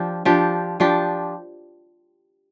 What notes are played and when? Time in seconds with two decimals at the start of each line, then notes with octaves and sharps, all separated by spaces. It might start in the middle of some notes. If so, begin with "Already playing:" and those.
Already playing: F3 D4 G4
0.25 F3 D4 G4
0.80 F3 D4 G4